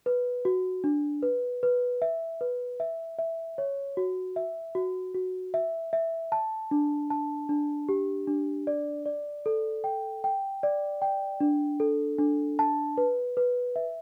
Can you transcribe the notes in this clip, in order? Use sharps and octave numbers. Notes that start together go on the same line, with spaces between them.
B4
F#4
D4
B4
B4
E5
B4
E5
E5
C#5
F#4
E5
F#4
F#4
E5
E5
A5
D4
A5
D4
G4
D4
D5
D5
A4
G5
G5
D5
G5
D4
A4
D4
A5
B4
B4
E5